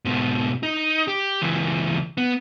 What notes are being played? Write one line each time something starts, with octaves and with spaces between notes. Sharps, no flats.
G#2 B2
D#4
G4
C#2 E3
B3